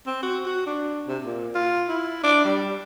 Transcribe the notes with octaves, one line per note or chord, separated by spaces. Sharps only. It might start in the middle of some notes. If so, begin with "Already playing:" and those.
C4
F#4
F#4
D4
C3
A#2
F4
E4
D4
G3